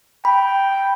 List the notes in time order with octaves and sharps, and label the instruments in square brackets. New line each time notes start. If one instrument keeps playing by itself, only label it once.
[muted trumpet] G5 [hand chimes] B5